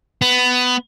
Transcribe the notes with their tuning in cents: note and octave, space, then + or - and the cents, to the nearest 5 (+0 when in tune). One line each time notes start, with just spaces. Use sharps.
B3 +15